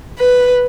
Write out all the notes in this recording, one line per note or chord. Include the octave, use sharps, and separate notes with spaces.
B4